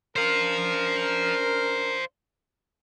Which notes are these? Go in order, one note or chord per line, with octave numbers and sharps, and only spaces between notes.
C#4 D4 A#4 C5 F5